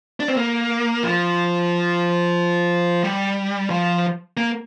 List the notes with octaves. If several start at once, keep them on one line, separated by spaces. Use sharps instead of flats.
D4
C4
A#3
F3
G3
F3
A#3